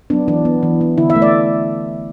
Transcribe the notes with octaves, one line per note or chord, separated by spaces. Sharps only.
F#3 B3 D4
E3 D4
B3
E3
B3
D3 E4
E5
A3
D5